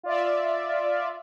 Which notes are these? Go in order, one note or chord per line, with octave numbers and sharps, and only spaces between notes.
F4 D5 E5